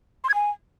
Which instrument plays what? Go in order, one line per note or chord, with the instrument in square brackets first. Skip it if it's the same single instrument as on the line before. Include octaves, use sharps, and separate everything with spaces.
[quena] C6
G#6
G#5